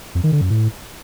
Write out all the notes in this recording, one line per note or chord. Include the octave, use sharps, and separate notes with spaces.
F2
D#3
D3
F#2
A2